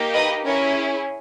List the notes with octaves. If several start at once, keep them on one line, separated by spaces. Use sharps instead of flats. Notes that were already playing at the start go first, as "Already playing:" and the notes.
Already playing: A#3 D#4 G4
B4 D#5
C#4 E4 G#4 A#4 C#5